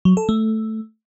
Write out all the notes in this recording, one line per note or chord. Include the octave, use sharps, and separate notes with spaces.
F#3
A4
A3